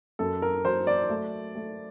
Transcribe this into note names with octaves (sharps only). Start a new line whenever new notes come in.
F#2 A4
A#4
F#3 C5
D5
A3
A3